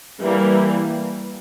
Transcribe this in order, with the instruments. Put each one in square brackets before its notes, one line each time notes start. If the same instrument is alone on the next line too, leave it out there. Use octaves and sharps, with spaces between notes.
[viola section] E3 G3 A#3